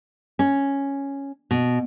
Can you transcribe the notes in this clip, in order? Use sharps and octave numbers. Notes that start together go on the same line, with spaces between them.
C#4
B2